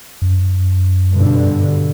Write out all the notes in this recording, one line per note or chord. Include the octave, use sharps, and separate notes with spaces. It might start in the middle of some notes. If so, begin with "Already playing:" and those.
F#2
G2 B2 D3